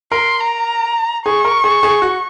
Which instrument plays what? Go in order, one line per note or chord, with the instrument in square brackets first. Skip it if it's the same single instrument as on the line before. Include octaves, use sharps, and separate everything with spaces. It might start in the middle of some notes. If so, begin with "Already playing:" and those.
[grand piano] A#4 [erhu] C6
[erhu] A#5
[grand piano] G#4 [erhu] C#6
[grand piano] A#4
G#4
G#4
F#4